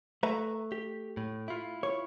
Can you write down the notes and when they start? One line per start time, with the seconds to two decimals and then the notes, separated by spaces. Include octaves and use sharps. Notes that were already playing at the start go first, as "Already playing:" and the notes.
0.23 A3 B4 E5 A#5
0.72 G4
1.17 A2
1.48 E4 F4
1.83 C#5